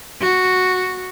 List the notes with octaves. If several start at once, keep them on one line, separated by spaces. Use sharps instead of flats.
F#4